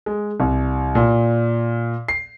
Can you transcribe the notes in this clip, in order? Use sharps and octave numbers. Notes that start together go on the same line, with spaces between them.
G#3
C2
A#2
C7